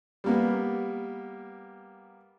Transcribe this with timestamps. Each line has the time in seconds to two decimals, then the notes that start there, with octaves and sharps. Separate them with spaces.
0.24 G3 A#3 B3